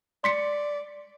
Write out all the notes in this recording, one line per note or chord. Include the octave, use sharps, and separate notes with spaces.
D5 C6 B6 C#7